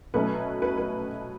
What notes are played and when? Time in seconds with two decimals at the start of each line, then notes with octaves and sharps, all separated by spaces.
0.14 B2 F#3 A3 C#4 B4
0.62 B4
0.78 B4